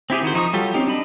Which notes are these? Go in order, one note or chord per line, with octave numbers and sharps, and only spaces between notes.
C4 E4 G4 G#4
D#3 F#4 C5
F3 D#4 C#6 D#6
F#3 G3 F4 G4 A4
C4 C#4 D#4 G4
D4 D#5 B5